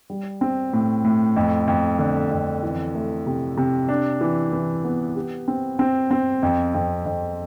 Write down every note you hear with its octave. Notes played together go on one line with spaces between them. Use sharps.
G3
C4
A2
A2
F2
F2
D3
F2
E3
A3
C3
C3
D4
E3
E3
B3
G4
C4
C4
C4
F2
F2
F2